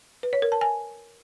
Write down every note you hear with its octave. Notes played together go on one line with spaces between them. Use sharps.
B4
C#5
A#4
A5
G#5